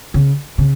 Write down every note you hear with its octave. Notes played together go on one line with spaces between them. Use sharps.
C#3
C#3